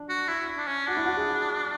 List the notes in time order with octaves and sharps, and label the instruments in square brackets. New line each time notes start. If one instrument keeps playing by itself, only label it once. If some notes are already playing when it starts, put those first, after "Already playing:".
Already playing: [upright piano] D4
[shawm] F#4
E4
D4
C#4
[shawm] D4 [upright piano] F#4
[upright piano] E4
F#4
G#4